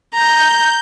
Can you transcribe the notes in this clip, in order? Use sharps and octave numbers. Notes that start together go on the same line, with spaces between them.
A#5 G6